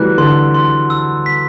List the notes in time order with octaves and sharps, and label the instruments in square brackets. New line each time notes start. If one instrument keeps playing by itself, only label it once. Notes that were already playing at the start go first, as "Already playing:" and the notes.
Already playing: [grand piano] E3 F#3 G3 A3 [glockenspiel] F#6
[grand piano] D3 [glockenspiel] C6
[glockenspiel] C6
E6
B6